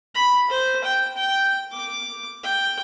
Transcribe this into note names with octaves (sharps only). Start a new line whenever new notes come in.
B5
C5
G5
G5
D6
G5